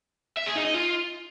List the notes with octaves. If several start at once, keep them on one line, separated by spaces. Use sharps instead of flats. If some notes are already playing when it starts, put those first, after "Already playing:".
E5
G#4
D#4
D#5
F4